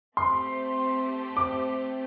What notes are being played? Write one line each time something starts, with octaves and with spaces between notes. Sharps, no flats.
A3 C4 G4 C5 C6
D6